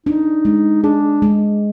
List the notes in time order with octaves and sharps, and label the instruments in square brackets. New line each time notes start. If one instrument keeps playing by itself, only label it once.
[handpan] D4 [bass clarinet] D#4
[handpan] G#3
[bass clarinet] D4 [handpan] G#4
[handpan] G#3